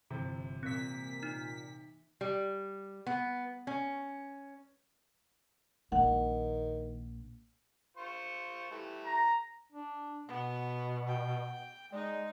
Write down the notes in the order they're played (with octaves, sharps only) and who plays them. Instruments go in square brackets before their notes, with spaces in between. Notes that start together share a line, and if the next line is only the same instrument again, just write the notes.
[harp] G1 E3 [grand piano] C3
[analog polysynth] A#2 B6 [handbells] C4 [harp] E6 G#6
[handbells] D#4
[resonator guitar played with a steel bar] G3
B3
C#4
[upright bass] A#1 A#3 [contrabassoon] D#3 [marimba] F#5
[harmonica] F4 C5 C#6
E3 G3 A3
[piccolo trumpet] A#5
[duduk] D4
[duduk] B2 [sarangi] B3 [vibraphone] F#5
[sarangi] G5
[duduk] G#3 [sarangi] D#4 [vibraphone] D5